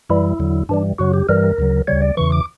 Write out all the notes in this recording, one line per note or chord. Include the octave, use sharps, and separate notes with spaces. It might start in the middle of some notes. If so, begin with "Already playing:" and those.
F#2 E3 G3 E4
E2 D3 F#3
G2 E3 G3 D4
F#2 C#3 F#3 F#4
G4
G2 E3 G3 A#4
D2 C#3 F#3
D2 C#3 G3 C#5
D5
E2 C#3 E3 C#6
D6